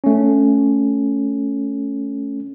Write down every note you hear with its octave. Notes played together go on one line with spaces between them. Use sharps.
A3 C#4